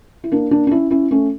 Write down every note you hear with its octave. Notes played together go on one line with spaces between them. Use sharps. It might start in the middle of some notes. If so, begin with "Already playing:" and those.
E4
A#3 D4
A#3 D4
D4
C#4 E4
C#4 E4
A3 C#4